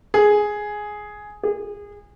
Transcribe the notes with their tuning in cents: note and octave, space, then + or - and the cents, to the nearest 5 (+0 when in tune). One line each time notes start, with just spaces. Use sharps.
G#4 +5
G#4 -25